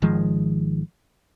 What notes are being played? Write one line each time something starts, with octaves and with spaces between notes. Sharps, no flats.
G#1 D#3 F3 G#3